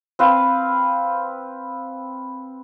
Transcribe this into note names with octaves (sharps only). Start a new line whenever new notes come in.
C4 B4 F5